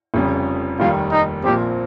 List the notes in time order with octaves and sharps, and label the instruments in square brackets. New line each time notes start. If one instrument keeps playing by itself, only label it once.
[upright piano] F1 F2 C#3 G3
[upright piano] F1 D#2 D#3 G3 [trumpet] F4
[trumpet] D#4
[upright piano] A#1 A#2 F3 C4 [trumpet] G4